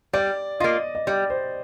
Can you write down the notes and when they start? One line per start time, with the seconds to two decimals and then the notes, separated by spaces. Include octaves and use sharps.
0.13 G3 D5
0.60 A#3 F4 D#5
0.95 D#5
1.07 G3 D5
1.30 C5